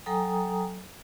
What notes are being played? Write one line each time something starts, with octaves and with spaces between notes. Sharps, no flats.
F#3 A4 G5 G#5 A#5 D#6